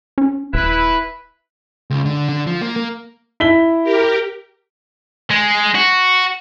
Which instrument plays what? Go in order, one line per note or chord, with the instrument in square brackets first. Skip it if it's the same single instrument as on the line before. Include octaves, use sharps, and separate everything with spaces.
[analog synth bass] C#4
[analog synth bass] D#1 [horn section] E4 B4
[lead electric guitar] C#2
D3
D3
F3
A#3
A#3
[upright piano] E4 B6 G7
[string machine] G4 A#4
[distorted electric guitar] G#3
F#4